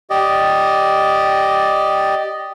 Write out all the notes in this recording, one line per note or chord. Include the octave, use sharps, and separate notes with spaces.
G4 D5 D#5